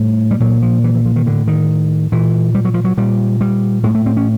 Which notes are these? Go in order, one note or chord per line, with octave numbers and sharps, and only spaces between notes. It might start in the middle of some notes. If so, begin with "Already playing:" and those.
Already playing: A2 G3
G3
A#2 F#3
F3
E3
E3
F3
D#3
A2 D3
D#3
A#2 E3
G3
F#3
F3
F#3
A#2 G3
G3
A2 G#3
A3
C4
C#4